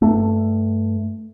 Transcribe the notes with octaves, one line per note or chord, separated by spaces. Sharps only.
G2 A3